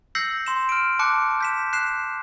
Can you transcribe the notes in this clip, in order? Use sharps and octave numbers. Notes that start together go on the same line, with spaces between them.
E6 G6 A#6 C7 C#7 F#7
C6 E7
F6 D7
A5 D6 F#6 C#7
G6 B6 E7
F#6 C7 E7